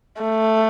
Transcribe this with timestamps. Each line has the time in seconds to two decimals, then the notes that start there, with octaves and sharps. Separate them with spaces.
0.21 A3